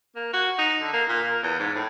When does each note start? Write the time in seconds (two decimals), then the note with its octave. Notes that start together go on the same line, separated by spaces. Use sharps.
0.16 A#3
0.33 F#4
0.58 D#4
0.81 D3
0.93 A#3
1.09 A#2
1.23 A#3
1.43 E2
1.59 G#2
1.75 A2